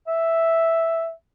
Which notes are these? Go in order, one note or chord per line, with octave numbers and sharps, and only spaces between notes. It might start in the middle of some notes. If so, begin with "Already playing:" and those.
E5